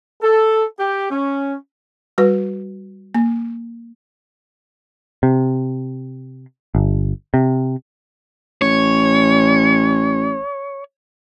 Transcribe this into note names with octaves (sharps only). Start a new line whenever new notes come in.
A4
G4
C#4
G3 F#4 B4
A#3
C3
G1
C3
A1 C#5